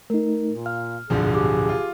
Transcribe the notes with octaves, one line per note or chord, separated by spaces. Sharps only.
A3 D#4 A#4
A#2
F5 F6
D1 G2 B2 D3 F3 G#4
G4 D6
F4